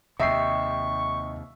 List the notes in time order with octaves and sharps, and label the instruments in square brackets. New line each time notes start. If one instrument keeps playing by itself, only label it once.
[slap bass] D#2 C3 [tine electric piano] D#5 G5 C7 [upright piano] E5 [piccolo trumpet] C#6